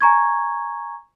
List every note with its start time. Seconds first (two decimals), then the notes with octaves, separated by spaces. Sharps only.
0.01 G#5 A#5 C#6 G#6